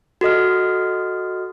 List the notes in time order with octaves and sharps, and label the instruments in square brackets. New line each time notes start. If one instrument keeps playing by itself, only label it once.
[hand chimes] F#4 A4 D#5 F6